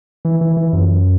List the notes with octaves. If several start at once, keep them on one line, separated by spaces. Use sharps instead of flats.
E3
E3
E3
F#2